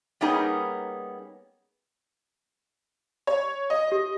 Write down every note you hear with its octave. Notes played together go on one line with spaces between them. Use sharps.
G3 A#3 B3 C#4 D#4 G#4
C#5
D#5
G4